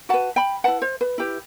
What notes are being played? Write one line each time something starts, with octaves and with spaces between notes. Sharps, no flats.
F#4 B4 F#5 A5
G5 B5
E4 B4 F#5 A5
C5
B4
E4 G4 B4